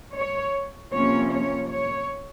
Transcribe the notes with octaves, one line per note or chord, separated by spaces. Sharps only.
C#5
C3 F3 A#3 C#4 C#5
C#5
C#5